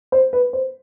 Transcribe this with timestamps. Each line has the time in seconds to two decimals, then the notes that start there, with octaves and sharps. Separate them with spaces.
0.12 C5
0.33 B4
0.53 C5